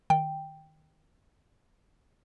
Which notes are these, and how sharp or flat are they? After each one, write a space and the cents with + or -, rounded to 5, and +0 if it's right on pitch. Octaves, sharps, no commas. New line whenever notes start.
D#3 +0 G5 +0